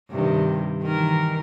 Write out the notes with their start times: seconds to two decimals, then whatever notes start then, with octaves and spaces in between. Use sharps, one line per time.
0.10 G2 C3 D#3
0.82 D#3 E3 A#4